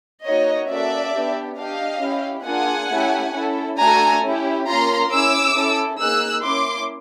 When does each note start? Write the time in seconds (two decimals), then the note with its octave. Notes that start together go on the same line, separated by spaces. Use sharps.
0.24 A#3 D#4 F#4 C#5 D#5
0.68 A#3 C#4 F#4 A4 D5 E5
1.12 B3 D4 G4
1.57 D4 G4 D#5 F5
2.01 C#4 E4 G4
2.45 A#3 D4 F4 G#4 F#5 G#5
2.90 A3 C#4 E4 G4
3.33 C#4 E4 A4
3.78 A3 D4 F#4 A4 G#5 A#5
4.22 C#4 E4 G4
4.66 A#3 C#4 F4 A#5 C6
5.10 C#4 E4 G#4 D6 E6
5.55 C#4 E4 A4
6.00 A#3 D#4 G#4 E6 F#6
6.43 A#3 C#4 E4 C6 D6